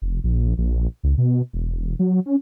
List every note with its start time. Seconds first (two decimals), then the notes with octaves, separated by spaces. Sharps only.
0.02 F1
0.24 A#1
0.58 A#1
1.03 C#2
1.18 B2
1.54 E1
1.76 E1
1.99 F#3
2.26 C#4